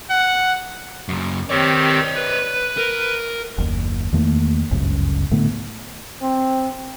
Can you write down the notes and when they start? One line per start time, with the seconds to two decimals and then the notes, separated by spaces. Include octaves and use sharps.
0.10 F#5
1.09 F#2 C#3
1.50 D#3 C4 G4 C#5 D5
2.16 B4
2.78 A#4
3.58 F#1 D#2
4.12 E2 D#3 A3 A#3
4.71 G1 C#2 F#2 C#3
5.31 A2 D3 A3 B3
6.22 C4